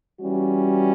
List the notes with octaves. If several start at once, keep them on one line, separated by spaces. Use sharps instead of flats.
E3 G3 C#4 F#4